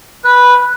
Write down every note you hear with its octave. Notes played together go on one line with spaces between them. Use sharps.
B4